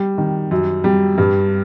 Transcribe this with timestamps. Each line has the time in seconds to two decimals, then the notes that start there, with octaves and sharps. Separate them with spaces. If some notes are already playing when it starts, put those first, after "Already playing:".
Already playing: G3
0.18 D#3
0.51 F#2
0.84 G3
1.18 G2